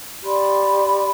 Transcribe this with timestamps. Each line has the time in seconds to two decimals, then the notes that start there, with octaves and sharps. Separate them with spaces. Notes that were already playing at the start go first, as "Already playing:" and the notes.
0.24 G4 D5 B5 C6